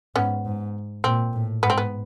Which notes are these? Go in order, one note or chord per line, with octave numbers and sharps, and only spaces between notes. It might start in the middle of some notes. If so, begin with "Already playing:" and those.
G#2 B3 C#4
G#2
A#2 C4
A2
G#2 B3
C4
B3